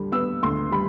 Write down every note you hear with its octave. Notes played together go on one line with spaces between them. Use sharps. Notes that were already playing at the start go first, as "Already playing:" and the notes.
Already playing: D2 D3 G3
B3 E6
D2 C6
G3 B5